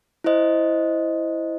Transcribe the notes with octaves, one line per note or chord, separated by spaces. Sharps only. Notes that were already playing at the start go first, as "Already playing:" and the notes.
E4 C5 D#5